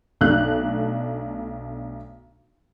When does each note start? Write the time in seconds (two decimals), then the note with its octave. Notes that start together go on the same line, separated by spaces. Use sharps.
0.21 B1 A3 D4 F#6